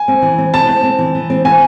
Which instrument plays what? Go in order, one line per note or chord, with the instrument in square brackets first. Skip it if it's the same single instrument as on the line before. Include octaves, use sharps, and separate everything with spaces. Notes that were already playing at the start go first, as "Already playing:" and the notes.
Already playing: [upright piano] G#5
[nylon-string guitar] C4
E3
C4
[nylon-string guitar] C4 [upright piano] A5
[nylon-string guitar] C4
C4
E3
E3
C4
[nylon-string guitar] C4 [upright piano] G#5